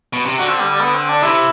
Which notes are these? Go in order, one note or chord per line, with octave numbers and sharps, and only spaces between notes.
B2
C3
D3 F#4
C4
G3
G3
B3
C4
D4
C3 E4